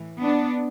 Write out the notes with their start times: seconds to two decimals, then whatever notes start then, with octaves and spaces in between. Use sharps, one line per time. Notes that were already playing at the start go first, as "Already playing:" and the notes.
Already playing: A2 E3
0.21 B3 D4